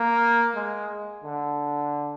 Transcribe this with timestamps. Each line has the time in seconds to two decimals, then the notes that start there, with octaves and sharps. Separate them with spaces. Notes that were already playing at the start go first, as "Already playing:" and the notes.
Already playing: A#3
0.55 G#3
1.24 D3